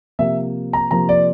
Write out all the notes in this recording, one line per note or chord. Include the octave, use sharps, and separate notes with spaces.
C3 F3 A#3 E5
A#5
C3 F3 A#3 A#5
D5